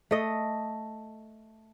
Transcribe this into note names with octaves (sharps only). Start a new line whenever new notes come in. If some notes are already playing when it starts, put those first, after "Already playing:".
A3 D#5